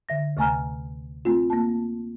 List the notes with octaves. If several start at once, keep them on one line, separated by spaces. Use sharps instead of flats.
D3 E5 A#6
D2 C3 A3 G#5 A#5 F6
A3 C4 F4
A#3 A5